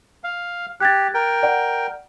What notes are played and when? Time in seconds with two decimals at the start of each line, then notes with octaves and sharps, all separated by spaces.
0.24 F5
0.80 G4 F#6 G#6 A6
1.14 A#4 G5
1.43 D5 F#5